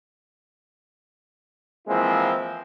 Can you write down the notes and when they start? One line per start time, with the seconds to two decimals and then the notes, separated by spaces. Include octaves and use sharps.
1.88 E3 F3 G#3 A#3 C4 E4